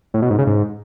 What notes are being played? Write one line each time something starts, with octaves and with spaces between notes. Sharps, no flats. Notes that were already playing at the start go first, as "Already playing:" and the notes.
A2
B2
G#2
C#3
G#2